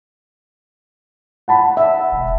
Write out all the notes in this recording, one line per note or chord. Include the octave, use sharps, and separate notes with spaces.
F#5 A5 B5
E5
E1